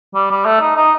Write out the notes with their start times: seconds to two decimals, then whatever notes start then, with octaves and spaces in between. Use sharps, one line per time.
0.15 G3
0.31 G3
0.46 A3
0.61 D#4
0.77 D#4